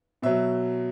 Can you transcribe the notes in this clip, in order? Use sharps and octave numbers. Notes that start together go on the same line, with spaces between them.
B2 F#3 E5